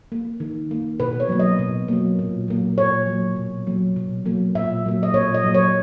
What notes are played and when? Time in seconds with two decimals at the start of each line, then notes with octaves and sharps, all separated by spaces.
0.12 A#3
0.40 D#3
0.71 A#3
1.00 B2 B4
1.20 C#5
1.29 F#3 A#3
1.39 D#5
1.59 B2
1.88 F#3 A#3
2.19 A#2
2.48 F#3 A#3
2.78 A#2 C#5
3.07 F#3
3.12 A#3
3.36 B2
3.67 F#3 A#3
3.96 B2
4.26 F#3 A#3
4.55 A#2 E5
4.85 F#3 A#3
5.03 D#5
5.14 A#2 C#5
5.34 D#5
5.44 F#3 A#3
5.55 C#5